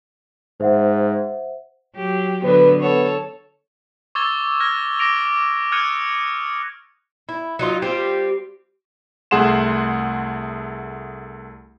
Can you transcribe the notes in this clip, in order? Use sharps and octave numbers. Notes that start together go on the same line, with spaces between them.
G#2 C5 E5 F#5
F#3 G4
D3 F#3 B3 B4
B3 A4 C#5
C#6 D6 E6 G#6 A6 G7
F6 G#6 A#6
D6 A#6 D7 F7
D#6 F6 F#6 G#6 C#7 D#7
E4
F#3 D#4 F4
G3 C4 F4 G4
C2 A3 G#4 F#5 C6 E7